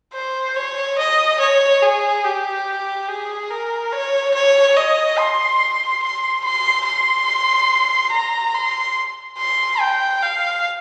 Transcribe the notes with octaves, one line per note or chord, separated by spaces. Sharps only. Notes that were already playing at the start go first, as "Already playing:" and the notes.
C5
C#5
D#5
C#5
G#4
G4
G#4
A#4
C#5
C#5
D#5
C6
C6
C6
C6
A#5
C6
C6
G5
F5